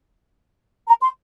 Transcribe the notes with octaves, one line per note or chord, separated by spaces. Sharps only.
A#5
C6